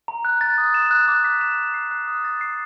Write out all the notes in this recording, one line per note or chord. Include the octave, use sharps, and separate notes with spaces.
A#5
F#6
A6
D#6
E7
F#6
D6
B6
E7
F#6
C7
F#6
D#6
A6
C7